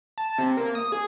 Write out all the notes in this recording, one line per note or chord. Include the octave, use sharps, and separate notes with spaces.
A5
C3
A#3
D#6
G#4